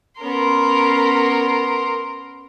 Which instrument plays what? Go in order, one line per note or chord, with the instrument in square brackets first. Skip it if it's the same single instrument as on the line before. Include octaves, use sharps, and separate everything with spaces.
[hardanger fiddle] B3 C#4 [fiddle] A#4 C6